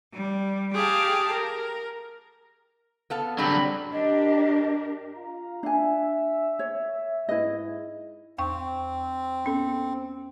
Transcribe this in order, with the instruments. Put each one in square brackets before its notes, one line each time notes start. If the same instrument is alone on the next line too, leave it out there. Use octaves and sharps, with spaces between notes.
[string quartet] G3
G4 G#4 F5 A5
A#4
[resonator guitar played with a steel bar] B3 A4 F5
[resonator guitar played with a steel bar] D3 C4 G4 [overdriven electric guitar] F#3 G3 [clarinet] D4 [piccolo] B5
[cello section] D4 G4 A#4 [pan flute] D#5
[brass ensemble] F4 F5 A#5
[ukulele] D4 G#5 [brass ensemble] E5
[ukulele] C#5
[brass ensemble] G#2 [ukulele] E4 B4 D#5
[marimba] E2 G5 C#6 [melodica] C4
[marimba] B3 C#4 A4